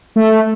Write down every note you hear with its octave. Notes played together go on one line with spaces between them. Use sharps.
A3